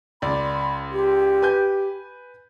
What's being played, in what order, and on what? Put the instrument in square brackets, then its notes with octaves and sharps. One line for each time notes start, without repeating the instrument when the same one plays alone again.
[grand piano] C#2 D5 [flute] B5
[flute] G4
[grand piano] B4 G#5 G6